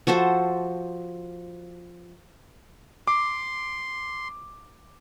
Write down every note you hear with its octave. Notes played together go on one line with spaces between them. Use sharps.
F3 F#4 A4 C5
C6 D6